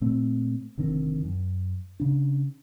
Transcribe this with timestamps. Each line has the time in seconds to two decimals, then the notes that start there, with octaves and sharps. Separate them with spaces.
0.01 A#2 A3 C4
0.78 F1 D3 D#3 C4
1.25 F#2
2.00 C#3 D4